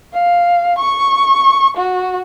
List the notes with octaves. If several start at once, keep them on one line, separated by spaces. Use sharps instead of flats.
F5
C#6
F#4